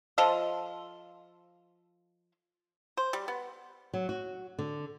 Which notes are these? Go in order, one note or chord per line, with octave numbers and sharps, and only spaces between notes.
F3 F4 A4 D#5
C5
G3
B3
F#3
F#4
D3